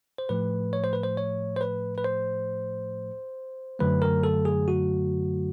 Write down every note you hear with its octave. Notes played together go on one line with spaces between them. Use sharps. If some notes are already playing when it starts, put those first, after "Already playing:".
C5
A2 F3 A3 B4
C#5
C5
B4
C5
C#5
C5
B4
B4
C5
F#2 D3 F#3 A3 B4
A#4
A4
G#4
F#4